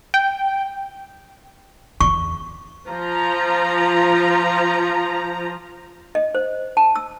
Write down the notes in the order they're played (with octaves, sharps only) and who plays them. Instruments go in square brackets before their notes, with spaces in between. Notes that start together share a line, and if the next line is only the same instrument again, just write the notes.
[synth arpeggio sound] G5
[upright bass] E2 [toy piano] C#6
[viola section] F3 A#5
[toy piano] D#5
C5
A5
E6